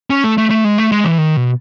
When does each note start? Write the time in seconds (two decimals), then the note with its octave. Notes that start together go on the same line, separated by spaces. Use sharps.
0.10 C#4
0.24 A3
0.38 A3
0.50 A3
0.64 G#3
0.78 A3
0.92 G#3
1.04 E3
1.18 D#3
1.37 B2